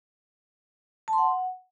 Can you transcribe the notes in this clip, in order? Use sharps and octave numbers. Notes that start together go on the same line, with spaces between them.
A5
C6
F#5